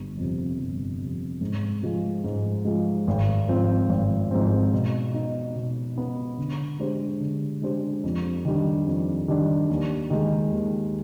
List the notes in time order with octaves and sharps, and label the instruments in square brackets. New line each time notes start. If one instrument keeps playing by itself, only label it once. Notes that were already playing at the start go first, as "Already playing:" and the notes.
Already playing: [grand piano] G1
F2 C3
G1
F2 C3
G#2
F3 G#3
G#2
F3 G#3
G#1
G#2 F3 C4
G#1
G#2 F3 C4
B2
B3 D#4
B2
B3 D#4
D3
G#3 D4 G4 C5
D3
G#3 D4 G4 C5
F2
D#3 G3 D4
F2
D#3 G3 D4
D#2
D#3 G#3
D#2